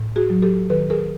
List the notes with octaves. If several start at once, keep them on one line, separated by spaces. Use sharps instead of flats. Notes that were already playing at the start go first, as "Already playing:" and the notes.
Already playing: A2
F#4 G#4
F#3
G4 A4
D#3 A4 B4
G#4 A#4